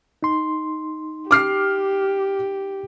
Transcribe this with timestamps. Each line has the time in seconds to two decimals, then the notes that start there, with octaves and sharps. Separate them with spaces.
0.23 D#4 C6
1.31 G4 D6 F6 C7